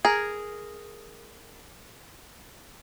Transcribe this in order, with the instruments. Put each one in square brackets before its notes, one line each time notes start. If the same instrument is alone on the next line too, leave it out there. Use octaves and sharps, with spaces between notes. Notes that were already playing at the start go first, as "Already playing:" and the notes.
[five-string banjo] G#4 A#4